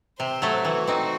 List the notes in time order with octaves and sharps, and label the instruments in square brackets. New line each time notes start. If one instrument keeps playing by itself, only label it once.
[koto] C3 [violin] C5
[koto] F#3 A3
[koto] E3 [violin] F#4
[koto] C4 D#4